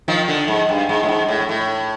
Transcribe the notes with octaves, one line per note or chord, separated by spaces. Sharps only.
D#3 F3
D3
G#2
G2
G#2
A2
G#2
A2
A2